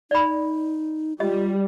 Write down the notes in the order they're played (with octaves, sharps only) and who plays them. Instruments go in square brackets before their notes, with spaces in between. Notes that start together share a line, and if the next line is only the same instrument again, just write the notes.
[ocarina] D#4 [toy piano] D5 B5
[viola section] G3 [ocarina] F4 [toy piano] D#5